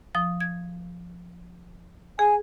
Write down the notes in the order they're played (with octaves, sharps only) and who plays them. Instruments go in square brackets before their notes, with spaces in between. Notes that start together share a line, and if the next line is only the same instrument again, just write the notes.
[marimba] F3 D#6
G#6
[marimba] G#4 [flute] G#5